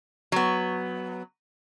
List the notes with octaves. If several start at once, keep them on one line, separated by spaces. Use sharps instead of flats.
F#3 B3